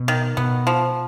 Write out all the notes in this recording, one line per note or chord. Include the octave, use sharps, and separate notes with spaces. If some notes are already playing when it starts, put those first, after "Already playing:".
Already playing: B2
D#3
B2 B3
F3